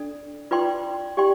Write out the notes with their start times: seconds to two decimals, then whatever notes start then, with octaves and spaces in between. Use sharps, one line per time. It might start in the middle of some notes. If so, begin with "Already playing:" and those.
Already playing: D4 A4 D5
0.51 F4 B4 D5 G5 C6
1.17 G4 D5 G5 C6